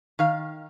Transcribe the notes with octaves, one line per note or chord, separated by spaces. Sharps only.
D#3 F5